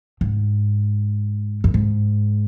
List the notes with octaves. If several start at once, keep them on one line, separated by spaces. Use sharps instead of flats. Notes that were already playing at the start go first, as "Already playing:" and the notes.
G#2
F#2
G#2